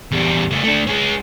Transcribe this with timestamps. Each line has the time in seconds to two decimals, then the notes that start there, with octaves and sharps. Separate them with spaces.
0.12 E2 G3
0.51 C#3 A3
0.64 A3 D4
0.87 G#3 C#4